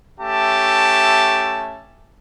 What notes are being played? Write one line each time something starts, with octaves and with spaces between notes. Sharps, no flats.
A3 C#4 G4 E5 A5